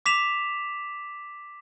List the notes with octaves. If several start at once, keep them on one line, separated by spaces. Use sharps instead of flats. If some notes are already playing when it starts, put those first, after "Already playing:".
D6 B6 E7 F7